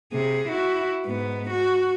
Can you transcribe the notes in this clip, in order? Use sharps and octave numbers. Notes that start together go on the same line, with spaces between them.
C3 G#4
E4 F#4
G#2 B3
F#4